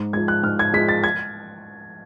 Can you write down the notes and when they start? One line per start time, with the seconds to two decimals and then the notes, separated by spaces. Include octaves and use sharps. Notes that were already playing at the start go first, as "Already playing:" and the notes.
Already playing: G#2
0.13 F3 G#3 G#6
0.28 F#6
0.43 G#2 F6
0.59 G#6
0.73 F3 G#3 B6
0.89 A6
1.04 G#6